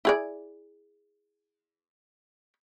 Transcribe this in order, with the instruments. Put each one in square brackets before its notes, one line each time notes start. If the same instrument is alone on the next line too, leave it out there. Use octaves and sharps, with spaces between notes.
[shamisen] E4 G#4 D5